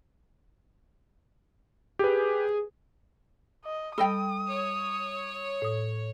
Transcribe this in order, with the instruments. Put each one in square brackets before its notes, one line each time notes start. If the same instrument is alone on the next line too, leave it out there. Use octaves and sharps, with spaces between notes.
[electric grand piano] G4 B4 [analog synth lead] G#4
[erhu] D#5
[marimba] G3 B5 [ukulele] A4 D#5 G5 [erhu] D#6
[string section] C#5
[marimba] A2 D#6